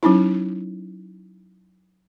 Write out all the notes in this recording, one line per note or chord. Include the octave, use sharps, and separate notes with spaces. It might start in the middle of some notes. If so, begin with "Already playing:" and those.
F#3 C#4 D#4 E4